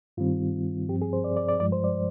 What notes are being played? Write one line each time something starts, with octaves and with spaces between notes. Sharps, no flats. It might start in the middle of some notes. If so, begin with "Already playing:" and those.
G2 D#3 G3 C4 F4
G2 F3 C4 G4
G#4
C5
D5
D5
D5
G2 F3 G#3 D5
C5
D5